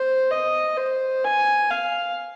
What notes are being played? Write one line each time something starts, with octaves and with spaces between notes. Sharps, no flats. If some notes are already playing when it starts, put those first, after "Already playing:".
Already playing: C5
D#5
C5
G#5
F5